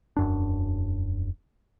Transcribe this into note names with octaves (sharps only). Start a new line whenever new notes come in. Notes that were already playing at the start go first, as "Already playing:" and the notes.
E1 F#2 D4